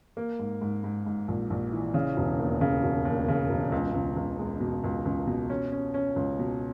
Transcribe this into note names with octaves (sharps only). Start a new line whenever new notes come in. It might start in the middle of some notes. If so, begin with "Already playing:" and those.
A#3
G#2
G#2
G#2
G#2
A#1
A#1
E3
C#3
E1
D#2
C#3
E1
D#2
C#3
E1
C#2
C#2
C#2
G#3
B2
C#2
C#2
B2
C#4
C#4
C#4
C#2
B2